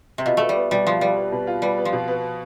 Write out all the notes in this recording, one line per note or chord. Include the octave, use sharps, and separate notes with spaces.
C3
B2 F4
A3 B4
G3
B3
B2 G3
F3 F4
G3 B4
B3
B2
F4
G3 B4
B3
F3
B2
B3